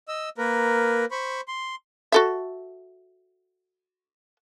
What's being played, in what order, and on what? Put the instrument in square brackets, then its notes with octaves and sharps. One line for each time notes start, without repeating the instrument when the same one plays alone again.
[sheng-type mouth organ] D#5 E6
A#3 A#4 B4
C5 B5 C#6
C6
[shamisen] F#4 A4 E5